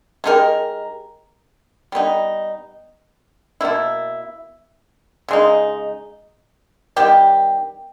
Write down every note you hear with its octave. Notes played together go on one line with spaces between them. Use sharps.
G#3 D#4 G4 A#4
G3 B3 D#4
B2 A#3 E4
C#3 G#3 D#4
D#3 G3 B3 G4